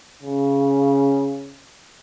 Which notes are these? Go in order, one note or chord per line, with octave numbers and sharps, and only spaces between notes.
C#3